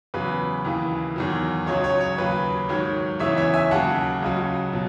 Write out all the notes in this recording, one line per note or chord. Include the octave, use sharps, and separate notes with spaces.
E2 C#3 F#3 B4
D#2 C#3 E3
E2 D#3 F#3
C#2 C#3 F#3 C#5
C#5
C#5
D#2 C#3 F#3 B4
G#2 D#3 F#3 C#5
E2 C#3 E3 C#5 E5
C#5 E5
E5 G#5
D#2 C#3 F#3 F#5 A5
C#2 C#3 F#3
B2 F#3